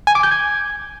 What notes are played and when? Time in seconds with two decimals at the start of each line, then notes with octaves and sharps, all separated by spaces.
0.07 G#5
0.15 D6
0.23 G6
0.31 G#6